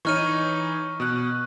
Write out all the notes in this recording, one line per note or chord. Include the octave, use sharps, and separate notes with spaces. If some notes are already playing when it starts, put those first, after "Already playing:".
E3 D#4 C#5 C#6 F6 D#7
B2 F#6